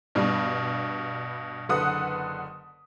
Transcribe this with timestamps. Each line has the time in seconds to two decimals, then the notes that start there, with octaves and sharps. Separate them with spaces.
0.15 G2 B2 G3
1.69 F#1 D3 B4 F#5 D#6